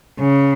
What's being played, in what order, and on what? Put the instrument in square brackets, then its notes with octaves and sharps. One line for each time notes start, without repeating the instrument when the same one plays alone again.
[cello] C#3